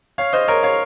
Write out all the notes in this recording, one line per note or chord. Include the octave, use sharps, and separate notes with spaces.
C#5 F5
C5 D#5
A#4 C#5
C#5 F5